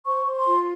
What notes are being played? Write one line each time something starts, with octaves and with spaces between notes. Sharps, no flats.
C5 C#6
C5
C6
F4